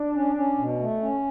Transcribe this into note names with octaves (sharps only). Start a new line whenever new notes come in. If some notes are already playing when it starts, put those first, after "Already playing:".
Already playing: D4
C#4
C#4
B2
A3
C#4